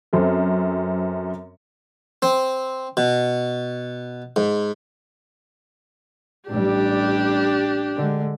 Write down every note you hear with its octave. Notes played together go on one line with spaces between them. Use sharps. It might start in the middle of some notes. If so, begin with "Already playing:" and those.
F#2 C4 A4
C4
B2
G#2
A1 G3 D4 G4
D3 G#3